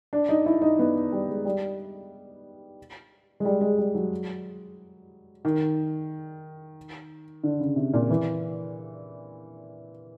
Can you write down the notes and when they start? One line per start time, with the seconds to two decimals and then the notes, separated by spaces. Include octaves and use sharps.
0.13 D4
0.29 D#4
0.46 E4
0.62 D#4
0.79 B3
1.12 G3
1.29 G#3
1.45 G3
3.40 G#3
3.45 G3
3.61 G#3
3.78 G3
3.95 F#3
5.45 D#3
7.44 D3
7.60 C#3
7.76 C3
7.93 A#2
8.10 E3